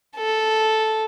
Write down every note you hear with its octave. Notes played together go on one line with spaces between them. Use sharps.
A4